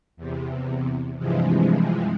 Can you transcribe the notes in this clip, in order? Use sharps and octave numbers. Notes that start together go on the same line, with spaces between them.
E2 C3
G2 C3 E3 F3 G#3